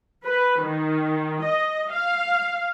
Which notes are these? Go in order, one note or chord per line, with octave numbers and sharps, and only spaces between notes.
B4
D#3
D#5
F5